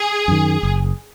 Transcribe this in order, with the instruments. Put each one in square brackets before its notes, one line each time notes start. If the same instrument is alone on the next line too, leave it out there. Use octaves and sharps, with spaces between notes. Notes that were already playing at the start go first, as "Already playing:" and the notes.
Already playing: [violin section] G#4
[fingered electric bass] F#2 D#3
F#1